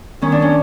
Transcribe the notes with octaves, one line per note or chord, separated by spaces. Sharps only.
D#3 C#4
D4
C#4